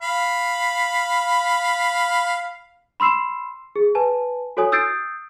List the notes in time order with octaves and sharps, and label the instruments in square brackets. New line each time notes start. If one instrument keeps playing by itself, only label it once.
[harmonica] F5 B5
[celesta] B5 C6 E6 C7 E7
G#4
B4 G#5 A5
F#4 A4 C#5 G#5 D#6
D#6 E6 G6 A6 C7 D7